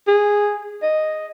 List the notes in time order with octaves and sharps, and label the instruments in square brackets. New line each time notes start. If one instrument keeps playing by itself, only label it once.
[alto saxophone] G#4
D#5